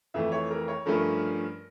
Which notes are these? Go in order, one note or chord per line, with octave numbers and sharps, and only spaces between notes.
F2 E3 A3 E5
C#5
A#4
C#5
G2 F3 A3 C#4 A#4